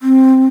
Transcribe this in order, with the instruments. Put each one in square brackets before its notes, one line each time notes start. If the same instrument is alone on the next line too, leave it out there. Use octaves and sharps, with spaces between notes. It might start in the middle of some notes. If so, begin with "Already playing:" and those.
[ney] C4